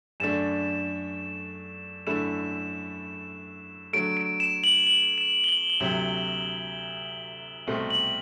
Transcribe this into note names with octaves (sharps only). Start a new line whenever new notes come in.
F#2 D3 A3 D4 E7
F#2 D3 A3 E4 E7
D3 F#3 A3 D7
D7
E7
F#7
F#7
E7
G7
F#7
F#7
D2 C3 F#3 G7
C2 B2 A3 C4
F#7